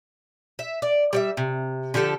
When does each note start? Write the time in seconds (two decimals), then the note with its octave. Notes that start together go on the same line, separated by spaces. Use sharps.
0.59 E5
0.82 D5
1.13 G3 D5 E5
1.37 C3
1.94 D3 F3 G4 A4